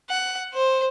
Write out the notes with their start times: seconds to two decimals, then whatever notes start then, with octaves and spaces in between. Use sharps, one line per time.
0.10 F#5
0.54 C5